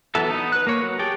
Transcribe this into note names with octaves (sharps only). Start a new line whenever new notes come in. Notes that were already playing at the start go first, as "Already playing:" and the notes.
E3 F#3 B3 A4 E5
B3 D#4
B4 F#6
A#3 A#4 C#5
F#3
G4 G#4 G5 A5